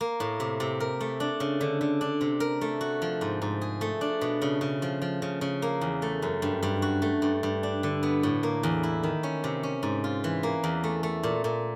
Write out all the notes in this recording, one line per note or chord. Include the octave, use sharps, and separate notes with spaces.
A#3
A2
C3
C3
A#4
A3
D4
C#3
D3
D3
D4
C3
A#4
A3
F#4
F3
G#2
G#2
G#4
A3
D4
B2
C#3
C#3
F3
F3
C#3
C#3
A#3
E2
A3
F#2
G2
G2
F#4
A3
G2
G2
D4
D3
B3
A2
A#3
E2
E4
D#3
C#4
C3
C#4
G#2
F4
E3
A#3
E2
A3
A3
A#2
A#2